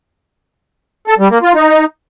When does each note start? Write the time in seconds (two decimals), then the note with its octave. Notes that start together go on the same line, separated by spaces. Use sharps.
1.07 A4
1.19 G3
1.31 A#3
1.43 F4
1.55 D#4